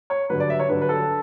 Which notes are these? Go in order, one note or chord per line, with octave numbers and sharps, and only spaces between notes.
C#5
G2 D3 F#3 B4
D5
E5
C#5
G2 D3 F#3 B4
B4
A4